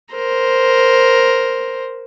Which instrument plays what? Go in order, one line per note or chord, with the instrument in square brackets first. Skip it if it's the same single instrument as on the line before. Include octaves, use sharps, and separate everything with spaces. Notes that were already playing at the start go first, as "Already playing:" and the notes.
[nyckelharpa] A#4 C5